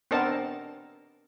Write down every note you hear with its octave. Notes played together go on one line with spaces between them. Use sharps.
B3 C4 D4 A#4 D#5 A5